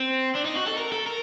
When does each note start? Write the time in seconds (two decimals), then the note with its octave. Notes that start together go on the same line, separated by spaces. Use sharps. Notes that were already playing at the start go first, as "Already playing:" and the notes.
Already playing: C4
0.35 D4
0.45 D#4
0.56 F#4
0.68 A4
0.78 A#4
0.92 A4
1.06 A#4